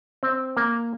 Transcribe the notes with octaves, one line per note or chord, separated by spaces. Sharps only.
C4
A#3